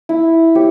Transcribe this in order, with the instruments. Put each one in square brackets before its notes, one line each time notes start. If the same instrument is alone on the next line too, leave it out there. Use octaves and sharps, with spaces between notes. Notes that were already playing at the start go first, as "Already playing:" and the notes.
[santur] E4
G4 C#5